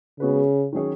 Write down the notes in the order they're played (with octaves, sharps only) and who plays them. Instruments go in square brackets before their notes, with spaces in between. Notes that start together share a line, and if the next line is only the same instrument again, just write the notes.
[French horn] C#3 [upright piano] G#3 B3 F#4 B4
[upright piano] D#3 F#3 C#4 G#4 C#5